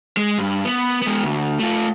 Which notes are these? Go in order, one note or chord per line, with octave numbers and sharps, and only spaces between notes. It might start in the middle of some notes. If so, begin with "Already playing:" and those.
G#3
G2
B3
G#3 B3
D2
A3 F4